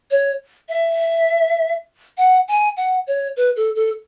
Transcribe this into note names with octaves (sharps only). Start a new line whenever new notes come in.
C#5
E5
F#5
G#5
F#5
C#5
B4
A4
A4